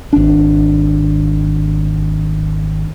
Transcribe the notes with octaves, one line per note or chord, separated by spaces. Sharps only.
G#1 D4